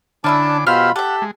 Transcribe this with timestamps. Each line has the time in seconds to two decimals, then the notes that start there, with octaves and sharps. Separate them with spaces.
0.24 D3 C#4 D4 E4 A5 D6 E6
0.67 B2 F4 G4 C5 B5 E6 F6
0.96 G4 A4 E5 F#5
1.22 G#3